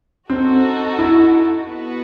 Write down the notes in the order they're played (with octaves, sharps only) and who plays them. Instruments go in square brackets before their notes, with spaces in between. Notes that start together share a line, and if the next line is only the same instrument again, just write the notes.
[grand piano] C4 [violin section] D#4 F#4 A4
[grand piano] E4
[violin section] B3 F#4 B4